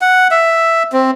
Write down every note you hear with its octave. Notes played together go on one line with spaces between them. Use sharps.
F#5
E5
C4